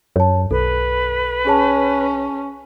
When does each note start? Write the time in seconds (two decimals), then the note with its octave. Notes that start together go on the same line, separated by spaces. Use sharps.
0.16 F#2 C#5 A5
0.51 B1 A4 B4
1.47 C#4 G#4 C#5 A5